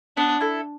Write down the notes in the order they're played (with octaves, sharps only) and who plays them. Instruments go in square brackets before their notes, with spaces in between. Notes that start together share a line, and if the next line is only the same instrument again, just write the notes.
[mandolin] B3 [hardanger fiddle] D4
[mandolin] E4 A4